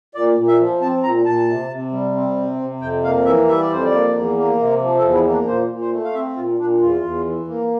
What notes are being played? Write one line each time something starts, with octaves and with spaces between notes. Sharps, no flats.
A#2 D5
A#2
E5
F3
C4 A5
A#2 A#5
A#2 A5
C3
C3
G3
C4
C3
C3
F2 G5
A#3 F5
E3 E5
G3 E5
D5
F2 C5
D5
A#3
E2
A#3
C3
F3
A4
E2
E4
A#3
D4
A#2 C5
A#2
C5
A3
F5
C4 E5
A#2 F4
A#2 D4
E2 F4
E2
E3
A#3